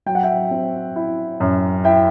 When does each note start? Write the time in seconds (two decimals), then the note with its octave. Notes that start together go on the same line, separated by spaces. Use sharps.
0.06 F#3 G5
0.15 F#5
0.23 E5 G5
0.51 C4
0.96 E4
1.40 F#2
1.84 E4 E5 G5